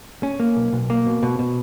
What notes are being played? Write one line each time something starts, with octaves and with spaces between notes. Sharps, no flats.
C#4
A#3
B1
B1
A#3
B2
B2
B2